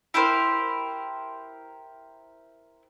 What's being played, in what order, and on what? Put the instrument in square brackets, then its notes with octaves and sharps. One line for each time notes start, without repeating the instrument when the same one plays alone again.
[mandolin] E4 G4 A#4 C5